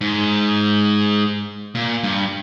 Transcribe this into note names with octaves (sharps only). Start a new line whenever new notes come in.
G#2
A#2
G2